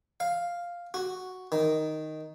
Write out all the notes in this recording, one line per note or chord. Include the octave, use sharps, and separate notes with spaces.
F5
F#4
D#3